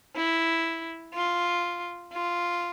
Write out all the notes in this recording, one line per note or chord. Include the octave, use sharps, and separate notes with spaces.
E4
F4
F4